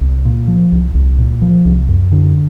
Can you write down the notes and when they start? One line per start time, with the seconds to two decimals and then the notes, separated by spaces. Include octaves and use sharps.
0.01 C2
0.25 A#2
0.48 F3
0.72 C2
0.95 C2
1.18 A#2
1.42 F3
1.65 C2
1.89 F#2
2.12 D3